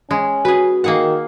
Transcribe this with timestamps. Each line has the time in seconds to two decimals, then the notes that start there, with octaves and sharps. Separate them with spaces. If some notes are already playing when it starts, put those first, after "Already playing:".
0.11 G#3 C#4
0.45 F#4 G#4 B4
0.84 D#3 A#3 G#4 F#5